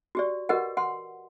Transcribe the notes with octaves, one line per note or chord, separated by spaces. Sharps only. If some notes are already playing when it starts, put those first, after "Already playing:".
F#4 G4 D5
F#4 G4 A#4 B4 D#5 F#5
F#5 C6